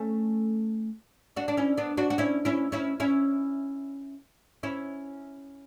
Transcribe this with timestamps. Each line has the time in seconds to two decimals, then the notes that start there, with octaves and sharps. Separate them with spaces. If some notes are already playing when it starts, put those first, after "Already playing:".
Already playing: A3 C#4
1.36 D4 F#4
1.48 D4
1.57 C#4 E4
1.77 B3 D4
1.97 D4 F#4
2.10 F#4
2.18 C#4 E4
2.45 C#4 E4
2.72 C#4 E4
3.00 C#4 E4
4.63 C#4 E4